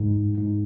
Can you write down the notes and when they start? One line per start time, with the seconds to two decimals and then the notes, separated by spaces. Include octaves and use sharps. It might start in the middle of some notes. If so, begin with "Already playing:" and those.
Already playing: G#2
0.38 G#2